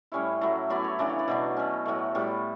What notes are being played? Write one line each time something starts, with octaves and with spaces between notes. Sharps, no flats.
A2 G3 C#4 E4 C#5
F#3 A3 E4
F#3 B3 E4 D5
C#5
C#3 E3 A3 D4 D5
C#5
D5
B2 F#3 B3 D4
B2 F#3 C#4
A2 F#3 A3
A2 G3 B3 E4